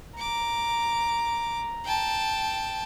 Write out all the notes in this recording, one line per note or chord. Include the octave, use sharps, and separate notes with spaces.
A#5 D6
G5 A5